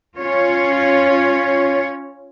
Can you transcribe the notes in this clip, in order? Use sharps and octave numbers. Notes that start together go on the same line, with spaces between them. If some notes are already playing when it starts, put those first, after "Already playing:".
C#4 F4 C#5